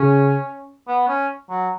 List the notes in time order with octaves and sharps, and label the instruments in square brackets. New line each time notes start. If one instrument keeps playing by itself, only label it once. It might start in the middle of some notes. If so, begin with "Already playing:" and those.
Already playing: [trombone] C#3 [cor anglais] C#4
[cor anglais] B3
C#4
F#3